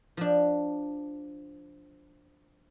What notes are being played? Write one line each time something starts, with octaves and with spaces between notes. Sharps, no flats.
F3 D4